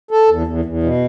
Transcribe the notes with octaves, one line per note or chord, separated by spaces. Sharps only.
A4
E2
E2
E2
B2